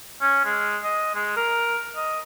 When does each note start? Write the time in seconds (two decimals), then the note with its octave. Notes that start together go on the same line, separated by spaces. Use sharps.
0.21 C#4
0.45 G#3
0.84 D#5
1.15 G#3
1.36 A#4
1.96 D#5